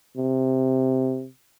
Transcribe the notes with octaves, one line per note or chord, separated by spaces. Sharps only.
C3